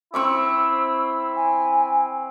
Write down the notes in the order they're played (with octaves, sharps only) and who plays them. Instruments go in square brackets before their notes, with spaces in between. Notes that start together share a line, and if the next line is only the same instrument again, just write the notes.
[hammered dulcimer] C4 C#6 D6 [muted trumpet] E4 [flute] E6
[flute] G#5